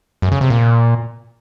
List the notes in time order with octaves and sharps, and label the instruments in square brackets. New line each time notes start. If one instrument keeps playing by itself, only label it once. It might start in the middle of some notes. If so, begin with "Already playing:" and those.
[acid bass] F#2
C#3
C3
A#2